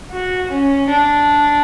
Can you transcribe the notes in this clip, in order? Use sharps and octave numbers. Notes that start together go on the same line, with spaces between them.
F#4
C#4
D4